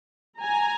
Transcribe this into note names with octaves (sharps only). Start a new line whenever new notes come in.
G#5 A#5